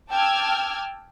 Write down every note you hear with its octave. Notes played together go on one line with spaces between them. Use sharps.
G5 A5 D6 E6 F6 G#6